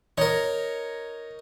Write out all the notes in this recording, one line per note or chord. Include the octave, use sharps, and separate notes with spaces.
D#4 A#4 C#5